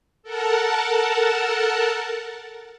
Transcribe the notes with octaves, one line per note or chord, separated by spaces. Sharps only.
A4 A#4 F#5 A5